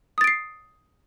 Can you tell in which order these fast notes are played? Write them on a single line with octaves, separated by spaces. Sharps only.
D#6 A6 D7 C7